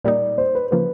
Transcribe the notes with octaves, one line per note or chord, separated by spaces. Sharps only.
A#2 G3 A#3 D#4 D5
C5
B4
C#3 F3 A#3 B4